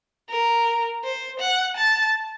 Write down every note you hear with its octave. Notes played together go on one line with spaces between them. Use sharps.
A#4
C5
F#5
A5